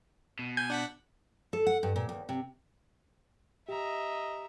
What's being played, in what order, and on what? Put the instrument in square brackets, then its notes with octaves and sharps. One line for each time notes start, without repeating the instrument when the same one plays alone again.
[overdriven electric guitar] B2
[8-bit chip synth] G#5 [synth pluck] G6
[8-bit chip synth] D4 F#5 B6
[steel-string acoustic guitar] A4
F#5
G2
A#2
D#2
C3
[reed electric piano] G4 [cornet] D#5 [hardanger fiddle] E5 A#5